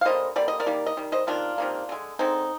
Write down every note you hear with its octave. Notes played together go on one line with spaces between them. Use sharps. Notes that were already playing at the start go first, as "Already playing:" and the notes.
F5
D3 G3 A#3 C5 D#5
D3 G3 A#3 D5
D#5
A#4 D5
D#3 G3 A#3
D#5
D#3 G3
C5 D#5
C3 D#3 A#3 D4 F4
C3 D#3 A#3
D3 G#3
D3 G#3 C4 D#4